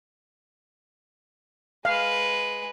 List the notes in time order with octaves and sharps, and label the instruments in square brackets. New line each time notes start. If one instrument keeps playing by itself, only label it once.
[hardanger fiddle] G#3 B4 [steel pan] F5